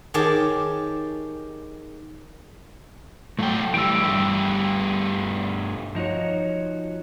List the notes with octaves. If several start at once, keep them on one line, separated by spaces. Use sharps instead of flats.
D#3 G4 G#4 C#5 A5
A2 F#3 A3 G5
E3 G3 G5 E6
G2 G3 A3
F3 D#4 F#4 C#5